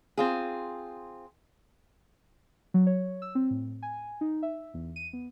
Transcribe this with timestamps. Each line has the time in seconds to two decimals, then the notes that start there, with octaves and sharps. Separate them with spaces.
0.18 C4 F4 G#4
2.74 F#3
2.87 C#5
3.22 E6
3.35 C4
3.51 A2
3.83 G#5
4.21 D#4
4.43 E5
4.74 E2
4.96 D#7
5.13 B3